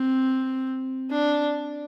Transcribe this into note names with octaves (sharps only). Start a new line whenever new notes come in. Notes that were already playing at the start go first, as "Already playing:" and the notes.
Already playing: C4
D4